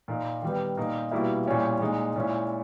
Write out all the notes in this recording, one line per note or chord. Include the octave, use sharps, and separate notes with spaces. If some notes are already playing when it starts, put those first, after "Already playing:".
A#2 A#3 D#4
D#3 G3 B3
A#2 A#3 D#4
B2 G3 A#3 E4
A#2 G3 C#4 E4
A#2 G#3 D#4
A#2 G#3 C#4 E4